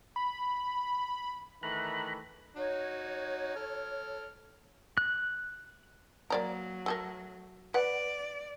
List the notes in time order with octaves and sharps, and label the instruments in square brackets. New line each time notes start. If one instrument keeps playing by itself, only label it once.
[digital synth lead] B5
[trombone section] D#3 E3 A3 [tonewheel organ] A#5 B5 F#6
[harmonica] D#4 F#4 [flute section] C#5
[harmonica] A4 F6
[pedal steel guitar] F#6
[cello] F#3 [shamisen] A#3 D5 A#5
[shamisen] A3 A4 A#4
[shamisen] B4 F#5 [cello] D5